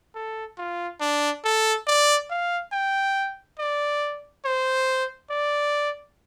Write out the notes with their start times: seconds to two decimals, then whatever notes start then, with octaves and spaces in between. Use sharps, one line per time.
0.15 A4
0.58 F4
1.01 D4
1.44 A4
1.87 D5
2.30 F5
2.72 G5
3.59 D5
4.45 C5
5.30 D5